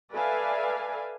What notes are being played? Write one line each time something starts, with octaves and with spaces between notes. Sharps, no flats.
A4 B4 D5 E5 F5 G#5